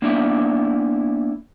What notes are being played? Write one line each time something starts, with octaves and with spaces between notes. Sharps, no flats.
A#3 B3 D4 E4 E5